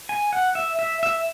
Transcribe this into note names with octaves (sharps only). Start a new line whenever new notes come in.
G#5
F#5
E5
E5
E5